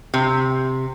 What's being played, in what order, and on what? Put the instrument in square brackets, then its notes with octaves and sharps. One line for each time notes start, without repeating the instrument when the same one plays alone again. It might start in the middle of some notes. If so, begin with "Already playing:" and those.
[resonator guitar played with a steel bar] C3